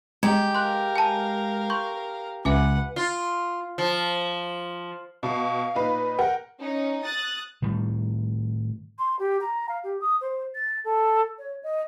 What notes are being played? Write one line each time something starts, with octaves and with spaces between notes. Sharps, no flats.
G#3 G4 G#5 A#5 G#6
A#4 F5 C6 F#6
G#5 A5
C6 C#6 G6
C#2 B4 E5 F#5 G#5 D6
F4
F3
B2 F5
A#2 D#4 B4
A#4 F#5 G5
C#4 D#4
D#6 F#6 A6
A2 D#3 G3
C6
G4
A#5
F5
G4
D#6
C5
A6
A4
C#5
D#5